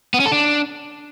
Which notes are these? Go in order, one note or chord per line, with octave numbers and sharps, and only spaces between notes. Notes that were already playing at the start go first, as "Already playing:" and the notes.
B3
C#4
A4
D4